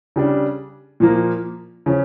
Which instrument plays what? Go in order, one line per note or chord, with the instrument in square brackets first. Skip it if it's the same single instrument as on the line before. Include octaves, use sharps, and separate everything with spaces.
[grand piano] C#3 G3 D4
A#2 F3 A#3
C#3 F3 C#4